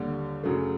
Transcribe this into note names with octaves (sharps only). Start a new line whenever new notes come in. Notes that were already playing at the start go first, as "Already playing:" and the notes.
Already playing: D#2 D3 G3
F#2 C#3 F#3 A3